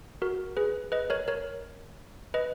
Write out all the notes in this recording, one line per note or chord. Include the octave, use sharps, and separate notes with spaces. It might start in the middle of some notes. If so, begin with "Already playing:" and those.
F#4 A#4
G#4 B4
B4 D#5
A#4 C#5
A#4 C#5
B4 D#5